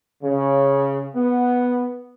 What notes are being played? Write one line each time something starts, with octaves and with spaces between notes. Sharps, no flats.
C#3
B3